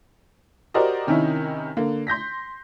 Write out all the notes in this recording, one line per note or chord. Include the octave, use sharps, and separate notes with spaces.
F#4 G4 A#4 C5 D5 D#5
C3 D#3 C#4 D#4 E4
D3 A#3
C6 G6 A#6 B6